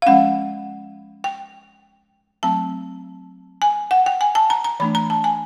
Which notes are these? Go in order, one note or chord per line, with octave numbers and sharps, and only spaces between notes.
F5
F3 G#3 C#4 F#5
G5
F#3 A3 C4 A5
G#5
F#5
G5
G#5
A5
A#5
A#5
E3 A3 D4 B5
A#5
A5
G#5